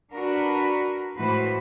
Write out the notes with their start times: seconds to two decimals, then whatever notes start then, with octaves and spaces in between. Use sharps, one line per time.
0.14 D4 F#4 A#4 B4
1.18 A2 E3 G#3 F#4 B4 C5